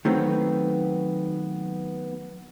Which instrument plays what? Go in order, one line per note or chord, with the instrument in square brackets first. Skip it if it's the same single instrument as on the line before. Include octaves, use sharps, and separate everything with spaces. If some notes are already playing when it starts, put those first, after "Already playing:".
[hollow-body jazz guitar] D#3 F#3 A3 B3 C4